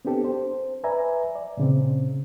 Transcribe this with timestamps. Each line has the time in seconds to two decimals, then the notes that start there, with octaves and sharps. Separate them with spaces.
0.05 B3 C4 D4 G4 A4
0.25 C5
0.84 B4 D5 E5 G#5 A#5
1.35 D5
1.57 A#2 C#3 C4